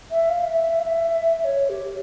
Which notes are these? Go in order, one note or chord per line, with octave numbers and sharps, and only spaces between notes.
E5
F5
E5
F5
E5
E5
C#5
G4